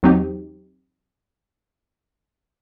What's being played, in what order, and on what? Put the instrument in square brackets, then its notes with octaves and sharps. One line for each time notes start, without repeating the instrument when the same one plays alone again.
[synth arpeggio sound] E2 F#3 C4 D#4 G4